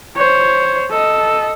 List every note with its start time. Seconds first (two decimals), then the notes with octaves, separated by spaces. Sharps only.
0.16 C5 C#5
0.90 A4 D#5